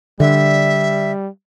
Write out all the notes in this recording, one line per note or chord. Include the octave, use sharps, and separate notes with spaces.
D3 G3 E5